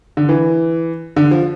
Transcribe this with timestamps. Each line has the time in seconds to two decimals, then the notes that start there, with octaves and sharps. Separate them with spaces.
0.17 D3
0.29 E3
1.16 D3
1.31 F3